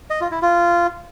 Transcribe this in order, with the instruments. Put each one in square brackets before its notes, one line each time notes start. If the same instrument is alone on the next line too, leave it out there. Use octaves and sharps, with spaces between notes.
[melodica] D#5
F4
E4
F4